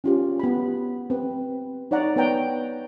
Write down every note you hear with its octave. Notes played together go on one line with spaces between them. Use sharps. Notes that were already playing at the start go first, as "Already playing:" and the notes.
C#4 F4 G4
B3 B5
C4 B4
D#4 C#5 D5 F#5 A#5
B3 B4 C#5 F#5 G5 A#5